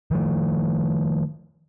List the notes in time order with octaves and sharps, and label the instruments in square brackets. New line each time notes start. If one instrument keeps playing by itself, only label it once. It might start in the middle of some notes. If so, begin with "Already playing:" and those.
[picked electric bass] D#3 F3 A3